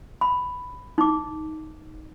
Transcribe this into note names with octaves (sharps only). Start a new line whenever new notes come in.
B5
D#4 D6